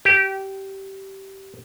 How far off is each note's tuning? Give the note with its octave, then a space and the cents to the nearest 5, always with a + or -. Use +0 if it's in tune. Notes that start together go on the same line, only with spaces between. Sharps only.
G4 -20